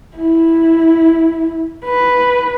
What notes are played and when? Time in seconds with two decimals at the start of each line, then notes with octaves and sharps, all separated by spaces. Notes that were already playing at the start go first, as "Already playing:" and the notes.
0.17 E4
1.85 B4